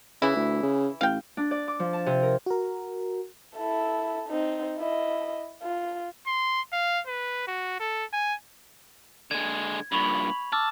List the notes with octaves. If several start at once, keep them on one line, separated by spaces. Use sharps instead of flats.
C#3 E3 E4
D2
C#3
A1 F5 G5
D4
D5
D6
F3
A5
C3
A#4
F#4 A#4
E4 A4
C4 D#4
E4 D#5
F4
C6
F5
B4
F#4
A4
G#5
D3 G#3 G#6
G2 A#2 B5 C#6 F7 F#7
A5 D6 E6 F6